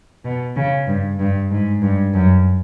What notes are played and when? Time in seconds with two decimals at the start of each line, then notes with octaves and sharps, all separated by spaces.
0.25 B2
0.56 C#3
0.87 G2
1.19 G2
1.51 G#2
1.82 G2
2.14 F#2